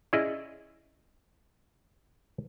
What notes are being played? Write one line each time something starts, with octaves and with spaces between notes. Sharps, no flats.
C#4 E4 G#4 D5 D#5